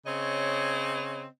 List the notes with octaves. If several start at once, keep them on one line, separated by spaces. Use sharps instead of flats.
C#3 C4 C#5 D#5